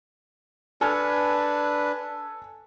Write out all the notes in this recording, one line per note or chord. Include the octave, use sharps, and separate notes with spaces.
D4 A4 B4 G#5 F6